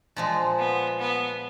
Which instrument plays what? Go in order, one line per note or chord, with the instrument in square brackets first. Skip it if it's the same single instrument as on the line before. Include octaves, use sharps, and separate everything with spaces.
[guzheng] A#2 F3 G#3
[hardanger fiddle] B3
B3